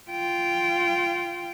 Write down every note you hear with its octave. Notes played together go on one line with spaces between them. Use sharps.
F4 G5